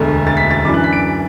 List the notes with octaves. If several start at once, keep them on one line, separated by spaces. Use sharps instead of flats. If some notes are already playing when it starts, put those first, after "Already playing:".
Already playing: E1 D2 D3 A3
A6
B6
A6
F#2 E3 D4 D6
F#6
B6
D7